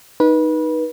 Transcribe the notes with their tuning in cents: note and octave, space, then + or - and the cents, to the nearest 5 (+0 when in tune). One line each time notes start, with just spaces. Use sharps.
D#4 +0 B4 -25